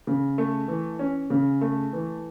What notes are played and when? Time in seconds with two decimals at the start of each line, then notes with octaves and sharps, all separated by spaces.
0.07 C#3
0.38 A3
0.68 E3
0.99 C#4
1.30 C#3
1.61 A3
1.93 E3